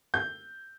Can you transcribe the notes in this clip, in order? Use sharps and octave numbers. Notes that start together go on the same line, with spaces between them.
G6